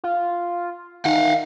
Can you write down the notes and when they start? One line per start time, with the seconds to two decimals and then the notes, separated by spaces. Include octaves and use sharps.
0.04 F4
1.05 D#3 F5 F#5